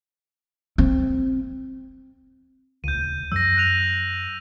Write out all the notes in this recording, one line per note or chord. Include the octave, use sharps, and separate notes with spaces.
C4
D#1 C#2 G6 D#7
F#2 F#3 E6 A#6
F#6 D#7 F7